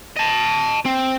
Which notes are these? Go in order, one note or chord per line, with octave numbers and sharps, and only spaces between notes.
D#5 A5
C4